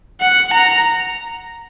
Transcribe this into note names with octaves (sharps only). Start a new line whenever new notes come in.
F#5
A#5